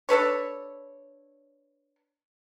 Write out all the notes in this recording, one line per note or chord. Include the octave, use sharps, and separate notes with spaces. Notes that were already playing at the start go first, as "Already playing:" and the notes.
D4 A4 B4 C#5